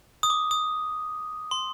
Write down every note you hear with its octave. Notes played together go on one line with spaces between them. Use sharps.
D#6
D6
D#6
C6